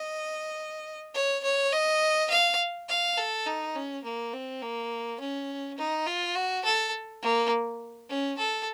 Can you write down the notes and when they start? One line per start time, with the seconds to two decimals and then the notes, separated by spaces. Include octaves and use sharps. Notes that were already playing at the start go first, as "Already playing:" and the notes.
Already playing: D#5
1.14 C#5
1.44 C#5
1.72 D#5
2.30 F5
2.89 F5
3.17 A4
3.46 D#4
3.75 C#4
4.04 A#3
4.33 C4
4.62 A#3
5.20 C#4
5.78 D#4
6.06 F4
6.35 F#4
6.64 A4
7.22 A#3
8.09 C#4
8.38 A4